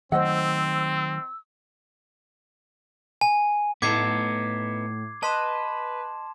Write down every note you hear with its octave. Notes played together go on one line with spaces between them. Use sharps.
D#3 F#3 A3 C4 C5 D#5 F#5 E6
G#5
A2 B3 D#4 A4 D6 G#6 C7
B4 D#5 A5 C6 E7